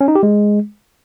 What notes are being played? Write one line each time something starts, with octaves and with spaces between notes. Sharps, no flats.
C#4
D#4
G4
G#3